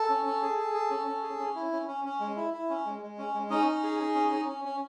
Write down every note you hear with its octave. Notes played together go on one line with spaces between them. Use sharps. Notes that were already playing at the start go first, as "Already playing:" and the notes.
Already playing: A4
C#4
C#4
G#4
G#4
G#4
C#4
C#4
G#4
C#4
E4
C#4
C#4
C#4
G#3
E4
E4
C#4
G#3
G#3
C#4
G#3
C#4 D#4 D#5
C#4
G#4
G#4
C#4
C#4
C#4
C#4